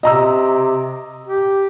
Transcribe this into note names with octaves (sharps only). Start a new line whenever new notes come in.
C3 D#5 A#5 E6
G4